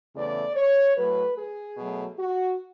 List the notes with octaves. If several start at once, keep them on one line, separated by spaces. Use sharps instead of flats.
E2 C#3 E3 A3 D5
C#5
A2 F#3 A3 B4
G#4
B2 F#3 A3
F#4